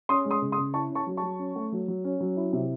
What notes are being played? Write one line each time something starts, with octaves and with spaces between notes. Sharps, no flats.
C#4 C6 D#6
G#3
C6 D#6
C#3
C6 D#6
C#3
E4 A5 C#6
C#4
A5 C#6
F#3
A5 C#6
F#3
C#4
A3
F#3
F#3
C#4
F#3
E4
C3